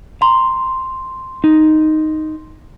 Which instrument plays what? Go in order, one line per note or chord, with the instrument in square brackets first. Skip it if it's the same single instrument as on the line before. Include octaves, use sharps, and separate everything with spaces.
[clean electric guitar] A#5 [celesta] C6
[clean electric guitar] D#4